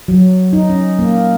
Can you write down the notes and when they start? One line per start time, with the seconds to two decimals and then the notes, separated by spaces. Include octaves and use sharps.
0.08 F#3
0.53 D#4
0.69 C#4
0.99 A#3